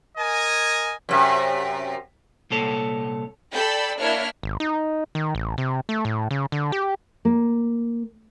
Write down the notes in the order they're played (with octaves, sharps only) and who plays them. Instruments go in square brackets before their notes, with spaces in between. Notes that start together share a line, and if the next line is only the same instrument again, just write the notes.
[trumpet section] A#4 D#5 G#5
[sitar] F#2 C3
[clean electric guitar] C2 A#2 A4 C#5
[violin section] A4 D5 G5 B5 E6 G6
A#3 D4 E4 C#5 E5 F6
[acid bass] G#1
D#4
D#3
A1
C3
A3
A2
C#3
D3
G4
[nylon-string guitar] A#3